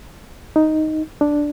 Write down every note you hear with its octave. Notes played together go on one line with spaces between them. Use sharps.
D#4
D4